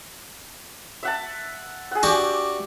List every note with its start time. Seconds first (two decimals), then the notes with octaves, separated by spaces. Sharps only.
1.03 E5 F#5 A5
1.91 G#4 F#5
2.03 D4 F#4 G4